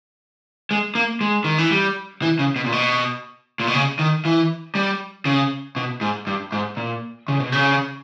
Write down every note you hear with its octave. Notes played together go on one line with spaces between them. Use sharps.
G#3
A#3
G#3
D#3
E3
G3
E3
C#3
B2
A#2
B2
A#2
B2
C#3
D#3
E3
G3
C#3
B2
G#2
G2
G#2
A#2
C#3
B2
C#3